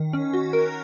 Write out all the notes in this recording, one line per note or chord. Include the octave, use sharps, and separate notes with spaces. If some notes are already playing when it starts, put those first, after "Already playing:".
Already playing: D#3
C#4
F#4
A#4